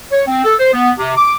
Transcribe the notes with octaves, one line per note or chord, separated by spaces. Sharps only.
C#5
C4
A4
C5
B3
C3
D6